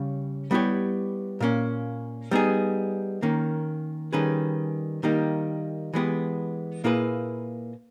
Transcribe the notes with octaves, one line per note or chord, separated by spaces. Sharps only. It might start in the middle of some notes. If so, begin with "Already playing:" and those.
Already playing: C#3 G3 C#4
G3 B3 E4 G4 C#5
A#2 A#3 C#4
G3 B3 D#4 G#4
D#3 A#3 C#4
D#3 G3 C#4 G#4 B4
D#3 G3 A#3 D#4 G4
E3 G#3 B3 G4
A#2 A#3 E4 G#4 B4